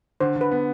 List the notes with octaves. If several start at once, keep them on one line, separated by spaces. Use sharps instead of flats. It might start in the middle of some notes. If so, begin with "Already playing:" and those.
D3 C5
D3 B4
B3